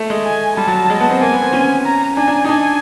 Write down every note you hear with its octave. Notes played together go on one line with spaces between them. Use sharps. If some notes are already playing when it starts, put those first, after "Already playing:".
Already playing: A3
G#3
G#5
G3 A5
F#3
G#3
B3
C4
A#3 G#5
B3
C4
C#4
A#5
D4 G#5
D4
D#4
D4 G#5